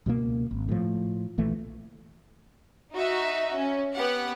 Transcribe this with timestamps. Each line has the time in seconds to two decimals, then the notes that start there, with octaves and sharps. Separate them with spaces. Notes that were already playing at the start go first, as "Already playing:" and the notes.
0.06 C#2 B2 F#3 A#3
0.51 G#1
0.69 A2 E3 F3
1.38 A#1 E3 A3
2.93 D#4 F#4 E5
3.53 C#4
3.94 B3 G4 F#5